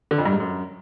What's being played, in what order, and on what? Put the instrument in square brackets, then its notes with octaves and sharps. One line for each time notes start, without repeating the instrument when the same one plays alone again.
[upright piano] D3
F2
G2
G#2
F#2